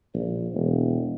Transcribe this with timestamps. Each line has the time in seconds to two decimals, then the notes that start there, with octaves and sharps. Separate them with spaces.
0.14 A#1
0.54 E1